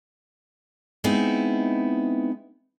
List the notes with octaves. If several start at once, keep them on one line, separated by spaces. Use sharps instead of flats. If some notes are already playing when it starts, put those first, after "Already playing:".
G#3 B3 C4 D#4 E4